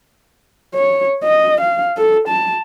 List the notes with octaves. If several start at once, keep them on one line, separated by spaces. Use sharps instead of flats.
C#5
D#5
F5
A4
A5